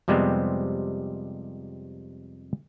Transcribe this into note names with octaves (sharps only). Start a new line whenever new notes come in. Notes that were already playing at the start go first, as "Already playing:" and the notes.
F2 C3 G3 G#3 B3 C4